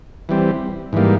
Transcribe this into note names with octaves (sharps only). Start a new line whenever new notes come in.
E3 G3 C4
G#2 E3 G3 A#3